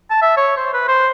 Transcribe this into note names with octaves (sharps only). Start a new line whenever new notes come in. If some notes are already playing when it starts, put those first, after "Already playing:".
A5
E5
C#5
C5
B4
C5